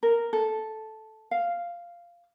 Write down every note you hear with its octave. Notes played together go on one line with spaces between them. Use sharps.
A#4
A4
F5